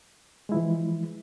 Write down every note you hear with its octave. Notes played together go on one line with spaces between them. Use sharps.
E3 F3 G#3 E4